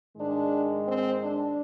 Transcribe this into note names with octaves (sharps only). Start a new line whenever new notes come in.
G#2 D#3 G#3 D4
C4
D4